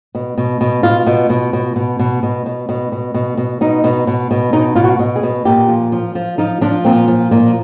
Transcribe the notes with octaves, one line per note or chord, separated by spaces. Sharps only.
B2
B2
B2
B2 F4
B2
B2
B2
B2
B2
B2
B2
B2
B2
B2
B2
B2 D#4
B2
B2
B2
B2 D#4
B2 F4
F#4
B2
G#4
B2
A#2 G4
F3
F3
F3
F3 D#4
F3 D4
A#2 C4
F3
A#2